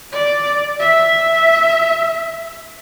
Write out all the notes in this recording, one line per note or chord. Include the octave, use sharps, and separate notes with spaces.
D5
E5